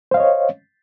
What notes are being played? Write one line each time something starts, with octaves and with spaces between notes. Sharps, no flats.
C5 C#5 D#5 F5